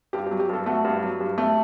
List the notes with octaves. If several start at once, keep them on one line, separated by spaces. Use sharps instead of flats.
G2 G4
G4
F#3
G4
G2 A4
A3 F#4
G2
F#3
G2
A3